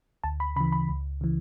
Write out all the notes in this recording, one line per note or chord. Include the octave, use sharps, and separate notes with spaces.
D2 A5
B5
C#3 E3 B5
B5
C#2
C#3 E3